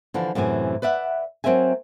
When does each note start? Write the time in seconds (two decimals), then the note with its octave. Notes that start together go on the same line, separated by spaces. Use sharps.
0.14 D3 E3 F3 D4
0.35 F#2 A2 C3 E3 G#5
0.82 B4 D5 E5 F#5
1.44 F#3 A#3 C4 A#4 E5 G#5